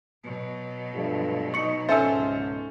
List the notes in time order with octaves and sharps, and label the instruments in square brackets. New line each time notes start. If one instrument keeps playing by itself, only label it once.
[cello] B2 F#3
[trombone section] G2 F3 A3
[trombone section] D#4 [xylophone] C#6 C#7
[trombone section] C#2 G#2 [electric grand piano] C#4 A4 C5 [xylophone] E5 G#5 E6